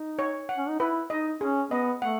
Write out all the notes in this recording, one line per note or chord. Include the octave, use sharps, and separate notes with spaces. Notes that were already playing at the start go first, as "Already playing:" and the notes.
Already playing: D#4
C#5
F#5
C#4
D#4
E4 B4
D#4 D#5
C#4 G#4
B3 D#5
A3 F#5